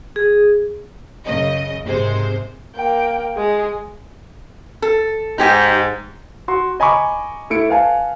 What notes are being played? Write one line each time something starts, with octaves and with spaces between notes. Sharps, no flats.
G#4
F#2 C#3 D#5
G#1 C3 G#3 C5
A#3 G5
G#3 G#4
A4
G#2 D#4 G4 G5
F#4 C6
D#5 G#5 A#5 B5 C#6 D6
A3 E4 C#7 D7
B4 F5 G#5 A5